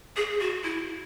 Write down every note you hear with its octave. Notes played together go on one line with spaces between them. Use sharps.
G#4
F#4
E4